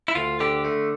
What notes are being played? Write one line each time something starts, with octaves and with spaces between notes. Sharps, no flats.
E4
D2 F4
D3 G4
A3